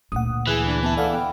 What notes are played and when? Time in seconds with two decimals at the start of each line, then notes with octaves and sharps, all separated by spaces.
0.12 D2 A#2 F#5 D#6
0.47 E3 G#4 G#5 F#6
0.66 D4
0.83 B3 E4 A5
0.97 A4 D5 F5 F#5
1.11 G5